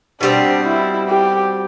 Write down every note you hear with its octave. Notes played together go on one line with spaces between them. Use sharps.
B2 G3 C4 D4
E4
G4